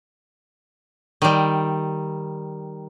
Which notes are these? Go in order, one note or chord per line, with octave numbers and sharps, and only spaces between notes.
D#3 G3